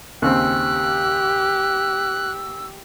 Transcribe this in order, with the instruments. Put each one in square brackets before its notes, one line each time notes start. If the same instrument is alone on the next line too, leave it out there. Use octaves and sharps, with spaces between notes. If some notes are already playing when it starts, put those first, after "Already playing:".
[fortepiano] D#2 C#3 C4 [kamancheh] G4 [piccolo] E6 [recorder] F#6